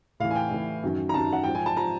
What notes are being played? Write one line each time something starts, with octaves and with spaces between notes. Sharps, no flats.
A2 E3 F5
G#5
G5
A2 E3
F#2 D#3 F#3
A#5
F#2 D#3 F#3 A5
F#5
G#2 F3 G5
G#5
A5
F3 A#5